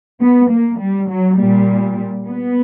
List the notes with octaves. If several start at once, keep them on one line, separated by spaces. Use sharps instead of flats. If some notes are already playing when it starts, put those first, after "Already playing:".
B3
A#3
G3
F#3
A#2 G3
B3